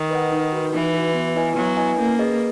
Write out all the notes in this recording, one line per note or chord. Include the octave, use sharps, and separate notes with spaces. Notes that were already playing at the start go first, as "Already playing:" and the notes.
Already playing: D#3
B4 D#5 F#5
D#4
F#4 B4
E3 D#4
F#4 B4
B3
E4 B4 D#5 G#5
F#3 B3
E4 B4 D#5 G#5
A#3 C#4
G#4 B4 D#5